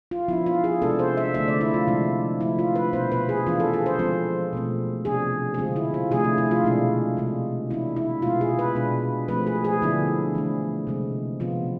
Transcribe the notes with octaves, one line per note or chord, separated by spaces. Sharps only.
F4
F3 B3 D4 E4
F4
G#4
C3 G#3 B3 D4 A4
C5
E5
D3 A3 D4 E5
D5
E4
F4
C3 F3 G#3 D4
F3 A3 D4 E4
F4
B4
B2 B3 D4 C5
B4
G#4
E3 B3 D4 F4
A4
G#4
C5
F3 G#3 C4 A4
B2 A3 C4
C3 F3 B3 D4 G#4
G#4
D3 G#3 C4 F4
E4
F4
C3 F3 A3 D4 G#4
E4
E4
F4
B2 G#3 D4
C3 G#3 D4
E3 B3 D4 E4
E4
B2 G#3 B3 F4
G#4
B4
B2 G#3 B3 D4
F3 A3 C4 B4
G#4
G#4
D3 F3 B3 D4 E4
E3 A3 D4
C3 G#3 C4
C3 F3 B3 F4